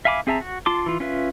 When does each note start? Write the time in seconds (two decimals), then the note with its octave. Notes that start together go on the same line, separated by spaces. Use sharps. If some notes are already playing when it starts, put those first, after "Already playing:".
0.05 E5 F5 G#5 B5 D6
0.27 C4 G#4 E5 A5 A#5
0.41 F#4
0.66 F4 A5 C6 D6
0.86 E3 F4
1.00 C#4 F4 B4 E5